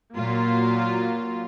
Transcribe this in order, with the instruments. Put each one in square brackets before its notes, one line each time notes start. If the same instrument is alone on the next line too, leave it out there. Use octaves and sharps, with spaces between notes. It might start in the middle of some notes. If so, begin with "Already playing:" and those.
[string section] A#2 F#3 A#3 F4